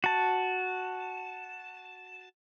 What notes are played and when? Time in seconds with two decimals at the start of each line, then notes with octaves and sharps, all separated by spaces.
0.04 F#4 A5